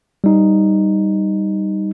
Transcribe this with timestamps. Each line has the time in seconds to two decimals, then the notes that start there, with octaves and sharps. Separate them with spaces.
0.24 G3 D#4